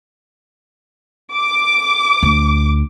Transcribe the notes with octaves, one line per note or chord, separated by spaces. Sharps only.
D6
D2